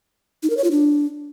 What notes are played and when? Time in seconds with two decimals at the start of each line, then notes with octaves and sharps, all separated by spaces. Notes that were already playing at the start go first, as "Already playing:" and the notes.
0.43 D#4
0.50 A#4
0.57 C#5
0.64 F4
0.71 D4